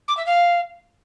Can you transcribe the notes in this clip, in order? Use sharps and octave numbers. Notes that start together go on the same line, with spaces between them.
D6
E5
F5